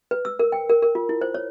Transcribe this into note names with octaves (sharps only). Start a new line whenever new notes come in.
B4
E6
A#4
G5
A#4
A#4
F4
E4
C5
C#5